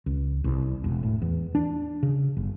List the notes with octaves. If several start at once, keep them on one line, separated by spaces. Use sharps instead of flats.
C#2
C2
E1
A2
E2
D4
C#3
G1